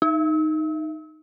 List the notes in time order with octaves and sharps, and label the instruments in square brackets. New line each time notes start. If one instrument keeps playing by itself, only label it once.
[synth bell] D#4